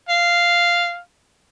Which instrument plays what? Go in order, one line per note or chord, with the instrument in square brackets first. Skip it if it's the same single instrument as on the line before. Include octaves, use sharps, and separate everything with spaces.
[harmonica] F5